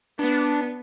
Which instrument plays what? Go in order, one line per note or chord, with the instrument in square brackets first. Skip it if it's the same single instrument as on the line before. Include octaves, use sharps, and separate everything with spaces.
[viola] B3 [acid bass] D4